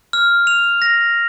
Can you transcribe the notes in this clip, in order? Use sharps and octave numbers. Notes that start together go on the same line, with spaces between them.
F6
F7
A#6